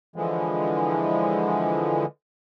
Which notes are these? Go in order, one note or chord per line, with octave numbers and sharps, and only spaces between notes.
D3 E3 F3 G#3